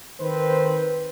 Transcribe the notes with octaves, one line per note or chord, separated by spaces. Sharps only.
D#3 C4 B4 C5